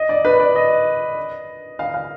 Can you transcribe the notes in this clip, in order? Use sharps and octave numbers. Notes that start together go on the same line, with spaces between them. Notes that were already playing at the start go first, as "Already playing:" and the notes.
Already playing: D#5
D5
B4
D5
D#5
F5
F5